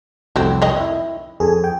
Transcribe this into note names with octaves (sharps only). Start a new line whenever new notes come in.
C2 F2 F#3 A3 C4
D#3 D#5
E4 E5
F2 G#4 A4 G#5
G5